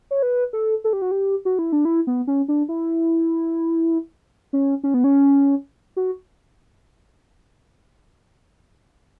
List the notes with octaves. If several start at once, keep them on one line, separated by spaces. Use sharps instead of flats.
C#5
B4
A4
A4
G4
F#4
G4
F#4
E4
D4
E4
B3
C#4
D4
E4
C#4
C#4
B3
C#4
F#4